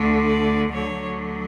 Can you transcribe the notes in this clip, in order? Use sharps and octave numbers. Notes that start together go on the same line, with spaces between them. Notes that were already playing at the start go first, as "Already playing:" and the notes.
Already playing: D2 D3 A3
D5
D2 D3 F#3 C#5